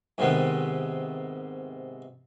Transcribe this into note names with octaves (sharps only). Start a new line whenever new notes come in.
G#2 C3 D#3 B3 C4